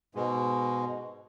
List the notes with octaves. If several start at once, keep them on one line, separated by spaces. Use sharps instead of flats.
G#2 B2 G#3